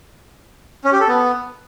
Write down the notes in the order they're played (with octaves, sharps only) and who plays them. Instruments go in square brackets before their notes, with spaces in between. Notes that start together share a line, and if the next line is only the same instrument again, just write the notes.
[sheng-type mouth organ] C#4
G4
A4
B3